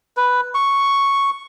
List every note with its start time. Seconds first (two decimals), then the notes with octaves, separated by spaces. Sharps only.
0.17 B4
0.55 C#6